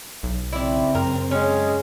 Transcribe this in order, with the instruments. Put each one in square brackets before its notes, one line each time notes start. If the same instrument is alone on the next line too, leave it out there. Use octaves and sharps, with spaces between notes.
[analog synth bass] B1
[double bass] C#3 C4 [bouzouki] E4 D5
[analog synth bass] F#2 [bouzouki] A#4
[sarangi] G#3 [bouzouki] C#4